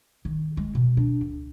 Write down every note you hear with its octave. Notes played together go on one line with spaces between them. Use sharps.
D#3
G#3
B2
D4
D2